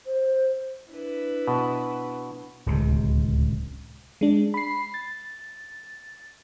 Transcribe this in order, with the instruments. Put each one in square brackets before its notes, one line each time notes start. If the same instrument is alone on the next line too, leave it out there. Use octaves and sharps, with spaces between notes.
[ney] C5
[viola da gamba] D4 E4 B4
[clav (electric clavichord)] B2
[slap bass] D1 C#2 C3
[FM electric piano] G#3 D4
B5 C7
A6